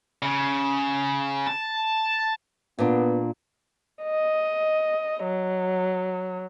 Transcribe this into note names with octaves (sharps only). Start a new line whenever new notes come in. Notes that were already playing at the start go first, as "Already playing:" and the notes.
C#3
A5
A#2 B3 D4
D#5
F#3